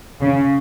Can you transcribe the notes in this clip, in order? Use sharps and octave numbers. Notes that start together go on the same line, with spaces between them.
C#3